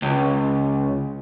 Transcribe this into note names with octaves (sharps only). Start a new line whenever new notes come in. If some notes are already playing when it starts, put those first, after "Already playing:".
C#2